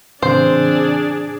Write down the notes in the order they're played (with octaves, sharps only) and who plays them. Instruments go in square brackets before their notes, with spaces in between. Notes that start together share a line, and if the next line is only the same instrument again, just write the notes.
[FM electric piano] A2 C#3 E3 [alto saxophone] C4 [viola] D4 G#4 [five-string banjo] C5